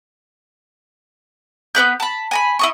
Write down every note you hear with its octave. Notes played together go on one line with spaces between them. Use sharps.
B3 C#4 B4 G6
A5 B5
G#5 A#5 B5
E4 D#5 C#6